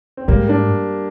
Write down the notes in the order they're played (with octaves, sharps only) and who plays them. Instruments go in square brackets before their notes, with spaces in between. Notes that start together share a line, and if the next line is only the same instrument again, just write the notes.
[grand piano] C4
[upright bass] G#2 [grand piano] G3 A#3
[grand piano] A#3 D4